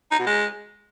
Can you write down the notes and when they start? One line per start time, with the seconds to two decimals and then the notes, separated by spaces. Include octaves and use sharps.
0.11 D#4
0.19 B2
0.27 G#3